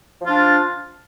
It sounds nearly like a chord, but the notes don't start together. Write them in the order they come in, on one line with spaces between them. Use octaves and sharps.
F3 F4 D4